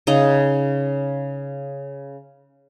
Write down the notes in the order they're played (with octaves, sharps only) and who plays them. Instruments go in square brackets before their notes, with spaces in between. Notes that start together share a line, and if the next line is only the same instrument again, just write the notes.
[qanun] C#3 D#4 D#5 A#5